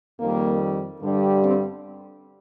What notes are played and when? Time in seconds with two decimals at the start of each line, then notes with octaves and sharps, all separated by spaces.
0.19 F2 D#3 G3 A#3
1.01 G2 D3 G3
1.41 C4